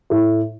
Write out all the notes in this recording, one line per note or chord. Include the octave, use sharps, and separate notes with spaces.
A2